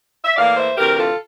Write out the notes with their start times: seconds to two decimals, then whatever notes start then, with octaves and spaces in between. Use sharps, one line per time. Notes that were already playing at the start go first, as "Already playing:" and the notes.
0.24 E5
0.35 A2 E3 A#3 D5 F5
0.56 C5 E5
0.76 D2 C3 E3 G4 A#4
0.97 F4 A4